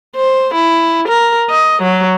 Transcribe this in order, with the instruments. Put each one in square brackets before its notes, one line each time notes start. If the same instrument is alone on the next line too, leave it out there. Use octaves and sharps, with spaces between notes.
[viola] C5
E4
A#4
D#5
F#3